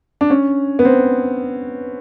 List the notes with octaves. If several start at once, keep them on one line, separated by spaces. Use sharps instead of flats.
D4
C#4
B3
C4